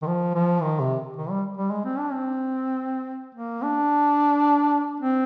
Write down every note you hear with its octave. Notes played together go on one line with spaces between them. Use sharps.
D#3
F3
F3
D#3
C3
D#3
G3
G3
G#3
C4
D4
C4
A#3
D4
C4